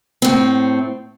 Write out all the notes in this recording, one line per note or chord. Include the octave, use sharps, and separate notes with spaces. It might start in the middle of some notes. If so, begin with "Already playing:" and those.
A2 C4